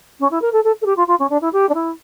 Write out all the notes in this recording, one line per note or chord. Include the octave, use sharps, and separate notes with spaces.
C#4
E4
A#4
A4
A4
A4
G4
F4
F4
C#4
D4
E4
G4
D4
E4